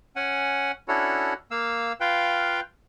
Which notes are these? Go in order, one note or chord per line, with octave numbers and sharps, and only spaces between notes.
C#4 F#5 G#5
C#4 D4 E4 F#4 A4 C#5
A#3 F5 E6
F4 B4 F5 G5